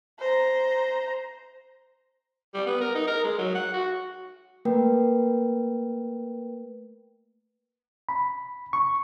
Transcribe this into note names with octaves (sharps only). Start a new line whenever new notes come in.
C5 A#5
G3
B3
A#4
D#4
A#4
G#3
F#3
F#5
F#4
A3 A#3 A#4 B4 G5
B5
C#6